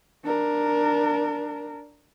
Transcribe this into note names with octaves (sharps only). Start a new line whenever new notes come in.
D4 A#4